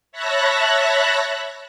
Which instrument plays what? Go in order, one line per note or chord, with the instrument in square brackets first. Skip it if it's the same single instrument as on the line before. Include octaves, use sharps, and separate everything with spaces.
[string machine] C#5 E5 A5 B5 F#6 A#6